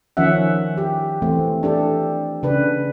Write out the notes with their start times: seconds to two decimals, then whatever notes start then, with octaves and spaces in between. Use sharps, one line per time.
0.17 D#3 F3 C#4 E5 F#5
0.78 G4
1.22 E3 A3 C4
1.63 D4 G4 A4
2.43 C#3 D4 B4